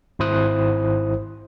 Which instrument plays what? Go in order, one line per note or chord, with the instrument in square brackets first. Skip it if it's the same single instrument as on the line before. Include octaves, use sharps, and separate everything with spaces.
[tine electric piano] G#1 E4 C5 D#6 F#6